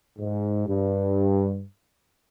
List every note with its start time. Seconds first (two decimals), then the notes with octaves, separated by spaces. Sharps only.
0.18 G#2
0.67 G2